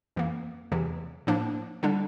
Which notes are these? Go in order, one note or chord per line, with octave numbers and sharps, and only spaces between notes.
F2 E3 A#3
E2 C3 E3
A2 F3 A#3 D4
D3 G3 D4